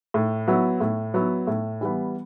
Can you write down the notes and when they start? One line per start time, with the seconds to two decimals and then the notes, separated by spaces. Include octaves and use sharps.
0.14 A2
0.48 F#3 B3 E4
0.80 A2
1.14 F#3 B3 E4
1.47 A2
1.81 E3 G3 B3